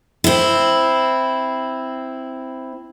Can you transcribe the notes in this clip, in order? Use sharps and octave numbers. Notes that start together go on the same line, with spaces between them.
C4 E4